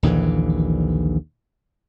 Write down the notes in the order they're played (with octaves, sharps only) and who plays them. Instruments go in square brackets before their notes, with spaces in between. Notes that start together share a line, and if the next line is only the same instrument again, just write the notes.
[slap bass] A#1 D#2 D3 E3